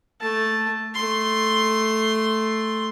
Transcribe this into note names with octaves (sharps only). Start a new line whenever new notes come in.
A3 A5
A3 C6